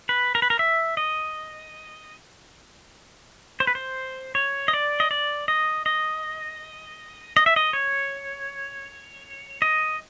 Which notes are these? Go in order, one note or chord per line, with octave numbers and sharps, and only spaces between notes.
B4
A#4
B4
A#4
E5
D#5
C5
B4
C5
C#5
D#5
D5
D#5
D5
D#5
D#5
D#5
E5
D#5
C#5
D#5